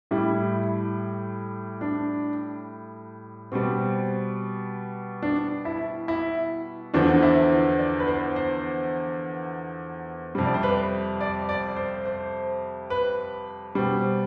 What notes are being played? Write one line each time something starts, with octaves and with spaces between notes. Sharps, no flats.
A2 G3 E4
D4
B2 G3 C4
D4
E4
E4
E2 D3 F3 D4
E4
C5
D5
B4
C5
C5
F2 C3 G3
D5
C5
B4
D5
D5
C5
C5
B4
B2 G3 C5